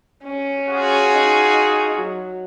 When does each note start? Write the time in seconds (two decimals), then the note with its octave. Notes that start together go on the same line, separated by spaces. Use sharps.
0.24 C#4
0.69 F4 F#4 G#4
1.13 D#4
1.96 F#3